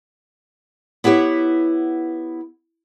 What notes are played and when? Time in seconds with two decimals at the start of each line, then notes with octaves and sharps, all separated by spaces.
1.04 B3 E4 G4 B4 C#5